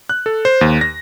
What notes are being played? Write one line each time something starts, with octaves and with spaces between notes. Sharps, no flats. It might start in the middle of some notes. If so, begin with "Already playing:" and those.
F#6
A4
C5
D#2
A#6